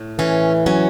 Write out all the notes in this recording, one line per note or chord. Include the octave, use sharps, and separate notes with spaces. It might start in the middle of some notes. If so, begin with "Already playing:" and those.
Already playing: A2
E3 C#4
F#3 C#4